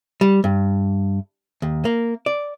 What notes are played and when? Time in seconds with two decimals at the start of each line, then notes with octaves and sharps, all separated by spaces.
0.21 G3
0.44 G2
1.62 D#2
1.85 A#3
2.26 D5